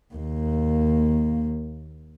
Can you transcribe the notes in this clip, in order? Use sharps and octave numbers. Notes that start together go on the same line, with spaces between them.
D#2 A#3